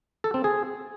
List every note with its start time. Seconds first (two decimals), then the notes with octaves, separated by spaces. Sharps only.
0.24 A4
0.34 C4
0.44 G#4